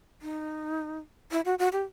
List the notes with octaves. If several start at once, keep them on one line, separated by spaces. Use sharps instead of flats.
D#4
E4
F#4
F#4
G4